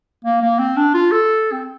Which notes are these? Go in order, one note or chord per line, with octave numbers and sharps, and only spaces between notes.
A#3
A#3
C4
D4
F4
A4
C4